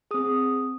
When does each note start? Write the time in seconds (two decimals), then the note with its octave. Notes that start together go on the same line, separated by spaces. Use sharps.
0.11 C4 G#4 D#6